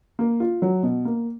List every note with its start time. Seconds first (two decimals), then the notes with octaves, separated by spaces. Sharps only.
0.19 A#3
0.40 F4
0.62 F#3
0.83 B2
1.05 A#3